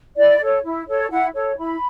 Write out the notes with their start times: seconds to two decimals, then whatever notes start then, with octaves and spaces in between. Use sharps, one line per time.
0.17 E4 D5
0.40 A4 C#5
0.64 E4
0.87 A4 C#5
1.10 E4 F#5
1.34 A4 C#5
1.57 E4 B5